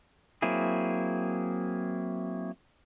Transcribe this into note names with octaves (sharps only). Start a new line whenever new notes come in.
F#3 A#3 C4 E4 G#4